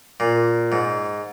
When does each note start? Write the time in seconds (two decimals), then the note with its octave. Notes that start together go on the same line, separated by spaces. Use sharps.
0.20 A#2
0.72 G#2